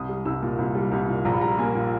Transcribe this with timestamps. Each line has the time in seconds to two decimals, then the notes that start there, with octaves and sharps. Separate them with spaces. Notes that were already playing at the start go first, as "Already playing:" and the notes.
Already playing: C2 D#6
0.09 G3
0.25 C2 E6
0.42 A#2
0.58 C2
0.75 G3
0.92 C2
1.08 A#2
1.25 A#1 A#5
1.33 B5
1.41 G3 A#5
1.58 A#3 G#5
1.75 A#2